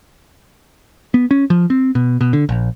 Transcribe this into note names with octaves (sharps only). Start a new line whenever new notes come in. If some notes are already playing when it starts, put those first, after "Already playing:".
B3
C#4
F3
C4
B2
B2
D3
A#1